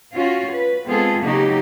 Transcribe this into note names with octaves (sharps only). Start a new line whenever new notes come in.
C#4 F4 F#4
B4
G#3 B3 C4 F4 G#4 A4
C#3 F#3 A#3 D#4 F#4 G4